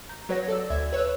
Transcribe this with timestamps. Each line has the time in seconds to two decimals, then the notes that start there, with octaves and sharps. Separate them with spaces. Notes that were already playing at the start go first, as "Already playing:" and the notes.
0.09 A#5 G6
0.29 F#3 B4 C#5 F#5 A#6
0.48 A4 D5 E6
0.70 D2 E5 G#6
0.92 B4 C#5 E6 F#6